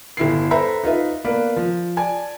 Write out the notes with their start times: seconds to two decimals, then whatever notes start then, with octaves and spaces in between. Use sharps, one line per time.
0.17 G1 E4 C7
0.51 A4 B4 C5 E5 A#5 B5
0.83 D#4 F4 B4 E5
1.25 A#3 B3 B4 D5 F5
1.56 F3
1.97 D5 G#5 A5